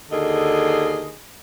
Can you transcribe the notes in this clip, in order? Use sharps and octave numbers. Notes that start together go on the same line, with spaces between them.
D#2 D3 G#4 D#5